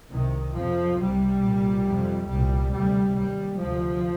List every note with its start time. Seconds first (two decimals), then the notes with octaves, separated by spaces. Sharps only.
0.11 C2 C3 D#3
0.54 F2 C3 F3
0.98 C2 C3 G3
1.42 C2 A#2
1.85 F2 C3
2.29 C2 A#2 G3
2.73 D2 C3 G3
3.16 D#2 G3
3.60 D2 C3 F3